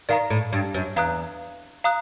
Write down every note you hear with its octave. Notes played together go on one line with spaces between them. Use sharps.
D#3 D5 F5 A#5
A2
G2
F#2
E2 F5 A#5 D#6 F#6
F5 A#5 D#6 F#6